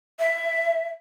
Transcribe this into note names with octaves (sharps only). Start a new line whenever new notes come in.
E5